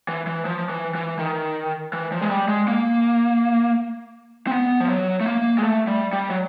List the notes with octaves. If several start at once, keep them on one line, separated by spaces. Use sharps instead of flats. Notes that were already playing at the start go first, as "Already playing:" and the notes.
E3
E3
F3
E3
E3
D#3
E3
F3
G#3
G3
G#3
A#3
C4
B3
F3
F#3
A3
A#3
G#3
A3
G3
G3
F#3